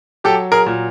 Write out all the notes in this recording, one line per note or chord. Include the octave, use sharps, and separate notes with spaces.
F#3 G4 A4
G#4 A#4
A#2